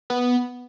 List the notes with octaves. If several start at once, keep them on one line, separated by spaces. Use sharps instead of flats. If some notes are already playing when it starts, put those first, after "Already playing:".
B3